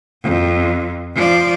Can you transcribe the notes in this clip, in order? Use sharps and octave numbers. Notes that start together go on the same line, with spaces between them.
F2
F3 D5